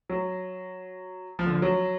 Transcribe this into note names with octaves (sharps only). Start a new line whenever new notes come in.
F#3
F3
D3
F3
F#3